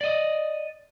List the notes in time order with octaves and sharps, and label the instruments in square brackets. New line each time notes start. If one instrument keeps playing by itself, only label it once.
[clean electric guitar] D5 D#5